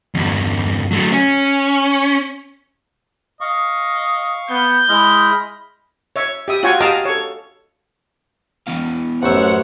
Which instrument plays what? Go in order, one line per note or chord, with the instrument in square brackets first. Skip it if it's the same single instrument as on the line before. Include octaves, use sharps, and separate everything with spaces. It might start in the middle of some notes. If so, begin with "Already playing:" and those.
[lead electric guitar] E2 G2
F#3 A3
C#4
[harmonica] D#5 [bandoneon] F5 C#6
[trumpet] B3 [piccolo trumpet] G6
[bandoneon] G#3 E4 F6 [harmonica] D#5 [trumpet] B5
[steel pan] C#5 E5
G4 E5 D#6
F4 F#4 C#5 G5 G#5 C#6
G4 D#5 F5 A5 A#5 D6
A4 C#5
[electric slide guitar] E3 B3 F5
[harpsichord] A1 E5 [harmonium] F#2 C5 C#5 [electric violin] F#5